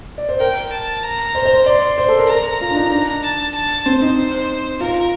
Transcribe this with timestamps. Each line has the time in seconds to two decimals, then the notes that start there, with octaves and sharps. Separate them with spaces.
0.18 D5
0.29 C5
0.40 A#4 G5
0.72 A5
1.04 A#5
1.35 C5
1.45 C5
1.66 D5 C6
1.98 C5
2.08 A4
2.18 A#4
2.28 A#4 A#5
2.61 F4
2.70 D4
2.76 D#4
2.92 D4
3.23 A5
3.55 A5
3.86 C4 C5
4.02 D#4
4.80 F4 A#4